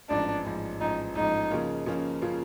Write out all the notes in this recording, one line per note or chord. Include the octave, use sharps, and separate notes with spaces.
A1 G#2 F3 D4
A1 G#2 F3
A1 G#2 F3 D#4
A1 G#2 F3 D#4
C#3 F3 A#3 C#4 F4
C#3 F3 A#3 C#4 F4
C#3 F3 A#3 C#4 F4